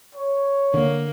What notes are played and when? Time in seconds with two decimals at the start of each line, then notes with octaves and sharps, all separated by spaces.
0.15 C#5
0.74 D3 A#3